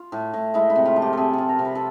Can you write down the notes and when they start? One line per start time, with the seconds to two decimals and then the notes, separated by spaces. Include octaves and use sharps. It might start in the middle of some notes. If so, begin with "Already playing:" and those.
Already playing: F4
0.12 A2
0.34 A2
0.54 G#3 E4
0.70 E4
0.76 C3
0.85 F4
0.96 F3
1.02 G4
1.13 C3 G#4 A4
1.33 F3 A4
1.49 A#4
1.59 C3
1.65 B4
1.75 A4